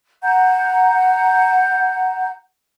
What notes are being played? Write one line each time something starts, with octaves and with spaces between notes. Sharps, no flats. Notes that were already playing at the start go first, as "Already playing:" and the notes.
F#5 A#5 G6